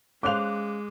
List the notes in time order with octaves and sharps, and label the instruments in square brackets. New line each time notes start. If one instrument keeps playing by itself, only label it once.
[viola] G#3 [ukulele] C#4 C5 F5 [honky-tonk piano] D6 F#6 F7